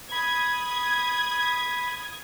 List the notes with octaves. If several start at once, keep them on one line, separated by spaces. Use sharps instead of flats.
B5 D#6 G#6